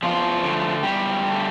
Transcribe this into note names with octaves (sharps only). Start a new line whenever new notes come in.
E2 F3 F4
D3 A3
E2 G3 G4
D3
A3